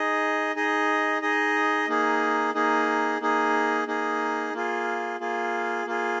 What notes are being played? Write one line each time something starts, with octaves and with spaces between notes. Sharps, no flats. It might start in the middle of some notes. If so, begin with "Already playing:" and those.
Already playing: D#4 G#4 D#5
D#4 G#4 D#5
D#4 G#4 D#5
A#3 D#4 G#4
A#3 D#4 G#4
A#3 D#4 G#4
A#3 D#4 G#4
A#3 F4 G#4
A#3 F4 G#4
A#3 F4 G#4